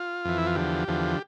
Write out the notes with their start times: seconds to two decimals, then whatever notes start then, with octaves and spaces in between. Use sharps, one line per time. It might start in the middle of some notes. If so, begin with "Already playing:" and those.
Already playing: F4
0.25 F2 E3
0.38 E4
0.47 F4
0.56 E2 D3 F3 G4
0.88 E2 D3 F3